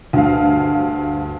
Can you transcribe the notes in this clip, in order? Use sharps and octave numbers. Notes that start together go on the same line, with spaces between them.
D2 G2 F5